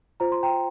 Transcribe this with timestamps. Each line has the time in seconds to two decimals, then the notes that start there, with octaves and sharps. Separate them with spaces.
0.20 F4 C5 A#5
0.32 C6
0.43 G5 A#5